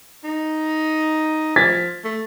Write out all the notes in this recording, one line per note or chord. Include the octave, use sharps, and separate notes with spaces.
D#4
F3 G#6 A6 B6
A3